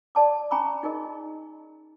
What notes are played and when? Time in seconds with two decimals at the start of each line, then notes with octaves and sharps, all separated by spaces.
0.15 D5 A5 D6
0.51 C#4 G#5 A#5 B5 C#6 D6
0.83 D#4 G#4 A#4 D#5